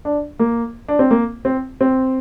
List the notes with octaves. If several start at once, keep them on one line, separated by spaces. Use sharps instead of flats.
D4
A#3
D4
C4
A#3
C4
C4